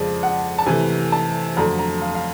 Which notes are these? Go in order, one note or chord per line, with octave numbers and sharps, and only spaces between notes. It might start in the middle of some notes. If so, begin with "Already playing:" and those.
Already playing: F2 C#3 F3 G#3 D5
F#5
A5
C3 E3 A3 G#5
A5
F2 D3 F#3 A3 A#5
A#5
F5
F5